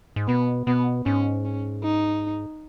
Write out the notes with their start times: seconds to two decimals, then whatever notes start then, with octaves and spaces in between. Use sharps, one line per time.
0.16 G#2
0.28 B2 B3
0.67 B2 B3
1.06 G#2 C#4
1.45 C#4
1.84 D#4